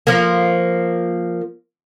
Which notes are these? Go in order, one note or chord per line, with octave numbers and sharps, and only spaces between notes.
F3 A#3